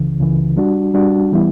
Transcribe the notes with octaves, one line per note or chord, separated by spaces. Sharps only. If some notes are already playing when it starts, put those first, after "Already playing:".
Already playing: C#2 C#3 E3
C#2 C#3 E3
G3 D4 F#4
G3 D4 F#4
E3 G3 B3 E4